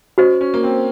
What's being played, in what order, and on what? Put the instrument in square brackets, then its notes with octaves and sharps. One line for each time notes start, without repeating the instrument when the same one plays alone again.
[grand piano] C#4 [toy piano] F#4 C5 D#5
[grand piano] C#4
A#3
C4